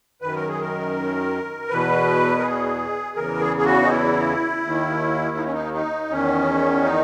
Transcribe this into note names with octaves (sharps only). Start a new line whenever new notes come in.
F#2 D#3 B4
A#4
G#4
A#4
E2 B2 B4
A#4
G#4
E2 C#3 E3 A#4
G#4
G#4
F#4
D#4
E4
D#2 D#3
D#4
C#4
D#4
D#4
E2 D#3 C#4
D#4